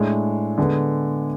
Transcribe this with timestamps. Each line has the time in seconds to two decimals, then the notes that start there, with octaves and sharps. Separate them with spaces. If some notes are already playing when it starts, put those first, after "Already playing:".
Already playing: A2 G#3 D4
0.58 D3 G#3 B3